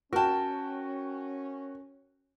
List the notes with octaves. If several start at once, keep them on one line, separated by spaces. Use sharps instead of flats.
C#4 F#4 A#4 G5 A5